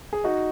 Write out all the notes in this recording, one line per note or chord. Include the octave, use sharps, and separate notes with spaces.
G#4
D#4 F#4